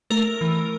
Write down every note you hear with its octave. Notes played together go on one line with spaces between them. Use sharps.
A3 A#4
E3